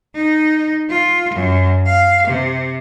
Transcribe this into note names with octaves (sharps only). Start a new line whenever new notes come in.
D#4
F4
F#2
F5
C3